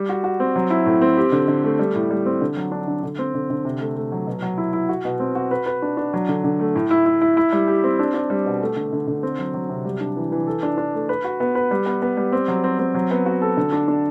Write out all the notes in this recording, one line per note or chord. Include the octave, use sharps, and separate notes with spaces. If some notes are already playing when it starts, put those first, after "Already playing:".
Already playing: G3
F#4
F#4
C4
F#3
E4
A2
C4
G4
D3
D3
A3
G3
A2
G3
C4
D3
F#3
D4
D3
D3
C4
D3
D3
C3
A3
A3
F#3
B2
F#3
E4
E4
F#4
B2
C4
F#4
B4
B4
D4
D4
F#3
D3
D3
A3
A2
E4
E4
E4
E4
G3
G4
C4
D4
D4
G3
B2
A3
D3
D3
D3
C4
F#3
F#3
C3
G3
D4
E3
E3
A4
D4
D4
A3
B4
F#4
B3
B4
G3
B3
B3
G3
C4
F#3
C4
C4
F#3
B3
F#4
A4
D3
D4
D4